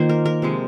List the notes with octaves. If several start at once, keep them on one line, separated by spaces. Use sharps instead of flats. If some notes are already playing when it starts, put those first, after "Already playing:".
Already playing: D#3 A#3 F4 C5
A#4
A#4
C3 F3 G#3